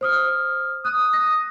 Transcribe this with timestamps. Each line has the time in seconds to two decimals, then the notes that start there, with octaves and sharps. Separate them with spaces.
0.01 C5 D#6 F6
0.85 D#6 F#6
1.13 A#6